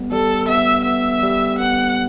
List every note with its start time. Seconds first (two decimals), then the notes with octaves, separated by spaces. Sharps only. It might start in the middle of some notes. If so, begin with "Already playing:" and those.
Already playing: G3 B3
0.12 G3 A4
0.49 B3 E5
0.86 B3 E5
1.23 G3
1.59 B3 F#5